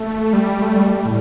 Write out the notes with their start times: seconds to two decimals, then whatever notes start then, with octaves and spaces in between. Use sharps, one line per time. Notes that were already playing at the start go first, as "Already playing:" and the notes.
Already playing: A3
0.33 G3
0.62 A3
0.76 G3
0.91 G3
1.05 A2